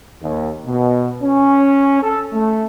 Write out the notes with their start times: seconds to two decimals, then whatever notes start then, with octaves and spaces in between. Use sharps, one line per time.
0.22 D#2
0.66 B2
1.22 C#4
2.02 A4
2.32 A3